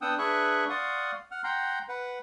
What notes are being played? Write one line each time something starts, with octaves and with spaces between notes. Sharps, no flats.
B3 D4 F#5 G5 D#6 E6
D4 G#4 B4 E5 C#6 F#6
D5 F5 F#5 C6 C#6 D#6
F#5 F6
F#5 G5 A#5 C6
B4 F#5